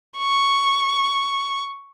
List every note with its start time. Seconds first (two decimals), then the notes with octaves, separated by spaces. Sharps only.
0.18 C#6